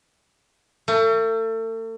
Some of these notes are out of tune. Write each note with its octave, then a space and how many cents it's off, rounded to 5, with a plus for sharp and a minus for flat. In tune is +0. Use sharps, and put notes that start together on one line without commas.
A3 +40